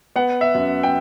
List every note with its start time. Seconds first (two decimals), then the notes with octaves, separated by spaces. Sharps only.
0.16 B3 F#5
0.41 E5
0.54 F#2
0.83 G5